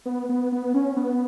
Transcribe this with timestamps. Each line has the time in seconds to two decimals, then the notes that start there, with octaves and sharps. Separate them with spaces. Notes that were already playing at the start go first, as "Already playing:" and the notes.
0.06 B3
0.29 B3
0.52 B3
0.74 C#4
0.97 B3